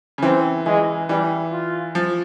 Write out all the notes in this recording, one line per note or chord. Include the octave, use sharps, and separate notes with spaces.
C#3
E3 C4
E3 G#3
E3 G3
F4
F3